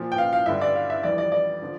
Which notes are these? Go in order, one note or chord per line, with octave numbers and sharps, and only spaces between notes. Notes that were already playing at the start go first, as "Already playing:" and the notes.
Already playing: A#2 F3
G5
F5
F5
G2 D3 G3 E5
D5
F5
E5
F2 E3 G3 D5
D5
D5
D3 F3